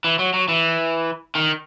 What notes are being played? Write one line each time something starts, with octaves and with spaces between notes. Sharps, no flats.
E3
F#3
F#3
E3
D#3